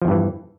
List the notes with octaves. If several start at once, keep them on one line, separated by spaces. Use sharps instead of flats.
E2 G2 E3 F3